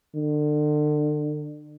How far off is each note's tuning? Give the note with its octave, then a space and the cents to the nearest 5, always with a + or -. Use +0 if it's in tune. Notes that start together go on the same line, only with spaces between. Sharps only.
D3 +35